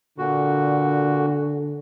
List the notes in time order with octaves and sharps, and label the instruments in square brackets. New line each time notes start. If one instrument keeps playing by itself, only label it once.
[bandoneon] A#2 F#4 [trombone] D3